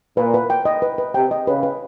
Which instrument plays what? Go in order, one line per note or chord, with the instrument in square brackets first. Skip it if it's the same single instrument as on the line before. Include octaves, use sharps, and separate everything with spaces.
[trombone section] A#2 [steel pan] B4
[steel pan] B4
G5
D#5
B4
B4
[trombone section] C3 [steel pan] G5
[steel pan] D#5
[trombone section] C#3 [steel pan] B4
[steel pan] B4